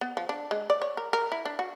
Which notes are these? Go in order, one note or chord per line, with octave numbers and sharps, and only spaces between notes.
B3
F3
D4
G#3
D5
C#5
A#4
A#4
E4
D4
F#4